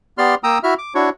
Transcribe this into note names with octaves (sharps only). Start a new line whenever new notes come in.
B3 G4 D5 C6 F6
A#3 G5 A#5 D#6 E6
E4 F#4 E5 F6
D6
D4 E4 F#4 C#5 C#6